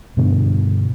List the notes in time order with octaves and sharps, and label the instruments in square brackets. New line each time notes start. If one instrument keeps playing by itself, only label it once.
[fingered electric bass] G2 B2 D3